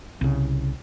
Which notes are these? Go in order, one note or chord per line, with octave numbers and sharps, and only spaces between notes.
C2 C#3